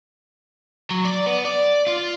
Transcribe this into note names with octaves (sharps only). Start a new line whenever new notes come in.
F#3
D5
B3
D5
F4